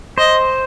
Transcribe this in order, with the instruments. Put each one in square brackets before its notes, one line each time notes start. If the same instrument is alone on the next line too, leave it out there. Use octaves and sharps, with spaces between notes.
[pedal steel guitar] C5 [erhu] D#5